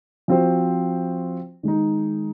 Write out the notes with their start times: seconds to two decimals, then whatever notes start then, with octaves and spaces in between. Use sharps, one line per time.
0.28 F3 C4 F#4 C5
1.63 D#3 G#3 D#4